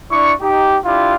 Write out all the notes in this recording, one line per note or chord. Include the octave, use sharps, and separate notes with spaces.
D4 E4 D5 C#6
D#4 G4
D4 E4 F4 G4 F5